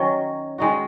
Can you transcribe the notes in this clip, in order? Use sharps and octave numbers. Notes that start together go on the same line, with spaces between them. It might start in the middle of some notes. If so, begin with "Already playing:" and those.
Already playing: D#3 F#3 C#4
D#3 G#3 D#4 F#4